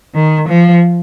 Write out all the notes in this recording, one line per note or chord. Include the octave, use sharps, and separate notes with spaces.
D#3
F3